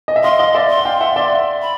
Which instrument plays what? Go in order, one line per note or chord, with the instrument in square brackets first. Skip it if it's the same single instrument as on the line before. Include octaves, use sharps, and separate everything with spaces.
[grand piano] D#5
E5
[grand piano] D#5 F5 [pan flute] C6
[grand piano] D#5 F5
D5 E5
[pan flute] C6
[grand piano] F#5
F5 G5
E5 F#5
D5 E5
[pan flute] B5